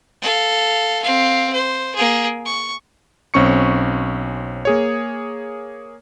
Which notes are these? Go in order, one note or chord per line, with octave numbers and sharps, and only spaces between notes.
A4 F5
C4 F5
C5
A#3 G#4
C#6
B1 C4 C#4 C#6 C#7
A#3 G#4 C#5